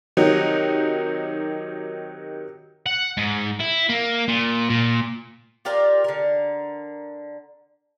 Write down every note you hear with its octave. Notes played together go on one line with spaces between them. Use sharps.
C3 D#3 F#3 D#4
F#5
G#2
E4
A#3
A#2
A#2
F4 G4 A#4 D5
D3 A#4